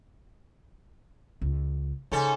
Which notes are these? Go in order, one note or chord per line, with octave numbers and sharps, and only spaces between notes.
C#2
G#2 C#3 C#4 A4